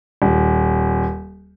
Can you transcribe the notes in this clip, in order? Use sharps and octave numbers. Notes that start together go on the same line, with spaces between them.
D#1